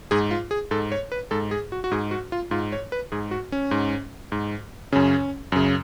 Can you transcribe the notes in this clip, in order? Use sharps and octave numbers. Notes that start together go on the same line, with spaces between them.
G#2 G#4
F4
G#4
G#2 A4
C#5
B4
G#2 A4
G#4
F#4
F#4
G#2 G#4
F#4
F4
G#2 F4
C#5
B4
G#2 G#4
F#4
C#4
G#2
G#2
F#2 C#3 C#4
F#2 C#3